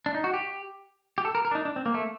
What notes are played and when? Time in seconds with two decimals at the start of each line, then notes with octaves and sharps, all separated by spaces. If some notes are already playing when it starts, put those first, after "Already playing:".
0.06 D4
0.15 D#4
0.24 F#4
0.34 G4
1.18 G4
1.25 A4
1.35 A#4
1.45 A#4
1.51 D4
1.55 D#4
1.65 D4
1.76 C4
1.86 A#3
1.94 A3